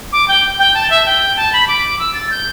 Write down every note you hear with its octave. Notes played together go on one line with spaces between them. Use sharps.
D6
G5
G5
A5
E5
G5
A5
B5
D6
E6
A6
G6